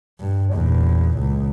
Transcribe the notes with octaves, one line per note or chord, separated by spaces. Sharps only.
G2
E2 A#2
C#2